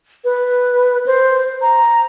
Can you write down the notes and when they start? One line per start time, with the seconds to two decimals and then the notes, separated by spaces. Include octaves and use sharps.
0.25 B4
1.07 C5
1.62 A#5